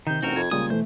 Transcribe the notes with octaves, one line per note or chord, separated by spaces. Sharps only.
C3 D#3 D#4 G6
A1 C4 F#4 A#4
F2 G#6
A#2 C#3 G3 G#3 D#6
B2 E3 A3 C5